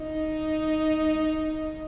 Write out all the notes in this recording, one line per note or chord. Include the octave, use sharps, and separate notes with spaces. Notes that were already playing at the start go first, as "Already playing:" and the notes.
Already playing: D#4